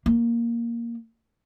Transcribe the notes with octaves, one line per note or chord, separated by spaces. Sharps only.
A#3